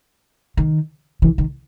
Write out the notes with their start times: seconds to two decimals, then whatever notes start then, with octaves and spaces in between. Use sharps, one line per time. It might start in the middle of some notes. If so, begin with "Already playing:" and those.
0.57 D#3
1.22 E3
1.38 D#3